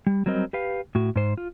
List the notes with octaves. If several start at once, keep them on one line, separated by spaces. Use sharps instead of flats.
G3
F#3 G3 C4 A#4 D#5
G4 B4 F5
A2 F#4
G#2 C5
F4